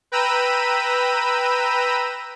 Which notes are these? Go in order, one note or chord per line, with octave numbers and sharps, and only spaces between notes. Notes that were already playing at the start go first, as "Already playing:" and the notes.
B4 G5 A#5 B5 E6 D#7